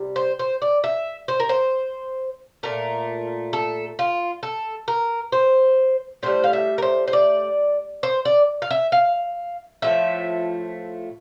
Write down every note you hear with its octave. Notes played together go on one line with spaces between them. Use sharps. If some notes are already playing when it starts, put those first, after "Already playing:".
Already playing: C3 G3
C5
C5
D5
E5
C5
A#4
C5
A#2 A3 A#4
A4
F4
A4
A#4
C5
A2 G3 C5
F5
E5
A#4
C5
C5
D5
C5
D5
F5
E5
F5
A2 F3 A3 E5